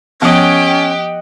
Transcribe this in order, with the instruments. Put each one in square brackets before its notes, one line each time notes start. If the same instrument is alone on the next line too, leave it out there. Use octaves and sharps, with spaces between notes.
[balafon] F3 B3 [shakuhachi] C#4 [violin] G4 G5 [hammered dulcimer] D#5 F#5